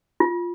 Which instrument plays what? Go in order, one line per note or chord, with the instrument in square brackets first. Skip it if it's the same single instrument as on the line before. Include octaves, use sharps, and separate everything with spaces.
[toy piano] F4